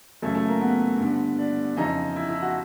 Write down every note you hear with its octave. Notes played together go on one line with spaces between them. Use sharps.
F#2 C#3 E3 A3
A3
A#3
B3
G2 D3
D4
F2 C#3 E3 D#4
E4
E4
F#4